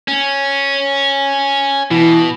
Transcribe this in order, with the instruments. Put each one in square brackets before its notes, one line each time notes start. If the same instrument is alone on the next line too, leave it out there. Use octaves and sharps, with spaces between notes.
[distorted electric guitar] C#4
[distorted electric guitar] B2 [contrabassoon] E3